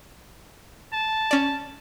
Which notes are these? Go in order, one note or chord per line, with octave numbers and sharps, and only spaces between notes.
A5
C#4 D5